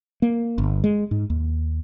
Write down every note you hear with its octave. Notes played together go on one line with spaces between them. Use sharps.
A#3
G1
G#3
G#2
D#2